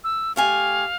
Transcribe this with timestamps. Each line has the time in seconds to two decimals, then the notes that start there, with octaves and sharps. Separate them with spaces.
0.04 E6
0.36 A3 G4 F5 G#5